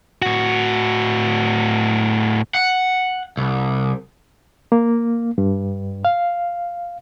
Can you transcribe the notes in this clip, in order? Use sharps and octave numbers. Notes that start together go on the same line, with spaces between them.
A2 F#4
F#5
C2
A#3
G2
F5